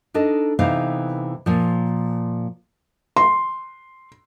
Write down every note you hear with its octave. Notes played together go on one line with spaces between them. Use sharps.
D4 D#4 A4 D#5
C3 E3 B3 D#4 F5
A#2 F3
C6